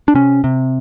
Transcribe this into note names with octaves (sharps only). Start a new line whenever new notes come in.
D4
C3 C#4
C3